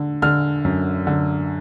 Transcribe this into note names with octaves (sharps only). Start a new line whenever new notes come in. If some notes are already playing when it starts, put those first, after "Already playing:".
Already playing: D3
D3 F6
F#2
D3